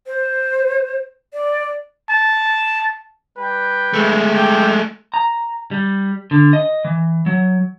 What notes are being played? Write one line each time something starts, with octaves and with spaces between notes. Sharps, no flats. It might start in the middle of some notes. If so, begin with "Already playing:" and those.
C5
D5
A5
G3 B4 G5
G#3 A3
G4 G5
A#5
G3
D3
D#5
E3
F#3